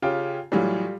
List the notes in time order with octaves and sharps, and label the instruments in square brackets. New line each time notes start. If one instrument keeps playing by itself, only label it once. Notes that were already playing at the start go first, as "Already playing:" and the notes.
[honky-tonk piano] C#3 C#4 [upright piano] F4 G4 G5
[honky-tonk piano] A2 E3 F#3 [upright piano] G3 F4